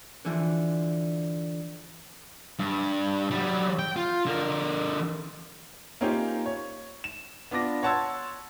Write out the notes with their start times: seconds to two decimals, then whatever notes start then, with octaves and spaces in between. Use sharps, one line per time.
0.25 D3 E3 F3
2.59 G2
3.31 F#3 G3
3.79 G5
3.96 F4
4.26 D3 A#4
6.01 A#3 C4 C#4 D#4 F4 G4
6.46 C#5
7.04 E7
7.51 B3 D4 F4 D6 A#6
7.83 C#5 F#5 A5 C6 E6 G#6